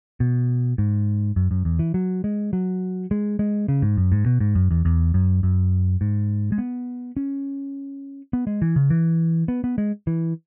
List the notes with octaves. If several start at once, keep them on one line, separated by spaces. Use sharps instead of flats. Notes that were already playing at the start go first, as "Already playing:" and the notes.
B2
G#2
F#2
F#2
E2
E3
F#3
G#3
F#3
G#3
G#3
C#3
G#2
F#2
G#2
B2
G#2
F#2
E2
E2
F#2
F#2
G#2
G#3
B3
C#4
B3
G#3
E3
C#3
E3
B3
B3
G#3
E3